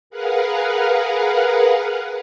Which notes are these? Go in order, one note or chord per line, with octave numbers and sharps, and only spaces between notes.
G#4 A#4 B4 F5 F#5